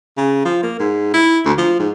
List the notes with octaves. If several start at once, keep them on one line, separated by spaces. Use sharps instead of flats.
C#3
F3
A#3
G#2
E4
D2
F3
G#2